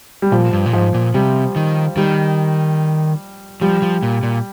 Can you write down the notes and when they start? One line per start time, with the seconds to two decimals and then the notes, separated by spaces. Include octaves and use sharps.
0.22 G3
0.32 A#2 F3
0.53 G2
0.66 A#2
0.73 G#2 F3
0.94 A#2
1.14 C3 G3
1.56 D#3
1.97 D#3 G3
3.61 F3 G3
3.82 F3
4.03 A#2
4.23 A#2